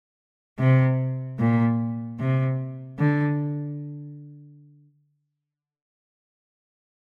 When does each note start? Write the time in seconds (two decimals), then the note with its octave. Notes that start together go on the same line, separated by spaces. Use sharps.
0.59 C3
1.39 A#2
2.19 C3
2.99 D3